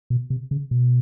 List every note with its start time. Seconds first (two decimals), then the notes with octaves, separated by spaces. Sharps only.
0.10 B2
0.30 C3
0.51 C#3
0.71 B2